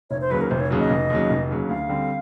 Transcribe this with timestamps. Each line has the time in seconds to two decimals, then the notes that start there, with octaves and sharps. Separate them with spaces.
0.10 F1 C#5
0.21 C5
0.30 D#2 C#3 F#3 B4
0.41 A#4
0.50 F1 C5
0.60 C#5
0.71 D#2 C#3 F#3
0.80 D#5
0.90 F1
1.10 D#2 C#3 F#3
1.30 F1
1.50 D#2 C#3 F#3
1.69 D2 F5
1.89 D3 G3 C4